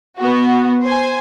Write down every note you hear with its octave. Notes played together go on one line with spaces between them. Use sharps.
B3 F#4
C5 G#5